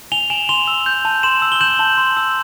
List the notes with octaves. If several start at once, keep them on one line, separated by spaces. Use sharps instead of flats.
G#5 F7 G7
G#5 E7 F#7
C6 F7 G7
E6
G6
A5
C6 E7 F#7
E6
G7
G6 E7 F#7
A5
C6
E6